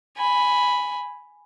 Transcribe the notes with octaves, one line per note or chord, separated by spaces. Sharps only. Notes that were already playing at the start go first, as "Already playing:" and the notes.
G#5 B5